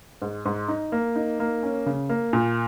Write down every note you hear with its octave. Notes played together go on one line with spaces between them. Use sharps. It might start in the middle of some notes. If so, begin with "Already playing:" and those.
G#2
G#2
D#4
A#3
D#4
A#3
C#4
C#3
A#3
A#2